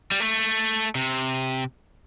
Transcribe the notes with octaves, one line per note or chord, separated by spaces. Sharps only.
G3
A3
C3